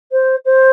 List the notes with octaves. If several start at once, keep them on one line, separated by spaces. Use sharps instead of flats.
C5
C5